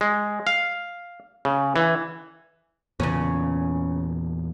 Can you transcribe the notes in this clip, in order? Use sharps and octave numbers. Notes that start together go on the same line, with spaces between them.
G#3
F5
C#3
E3
E2 A#2 C#3 C#4